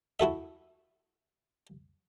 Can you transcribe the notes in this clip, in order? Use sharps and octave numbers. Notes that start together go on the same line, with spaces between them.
E4 F#4 A4 E5